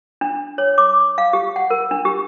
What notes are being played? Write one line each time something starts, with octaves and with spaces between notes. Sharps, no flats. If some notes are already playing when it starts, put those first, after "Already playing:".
D4
C#5
D6
F5
G4
F#5
A#4
D4
G4